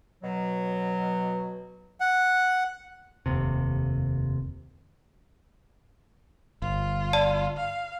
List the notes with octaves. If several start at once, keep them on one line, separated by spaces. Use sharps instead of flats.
B2 F#3
F#5
F1 D#2 C3
G1 F4
D5 A5
F5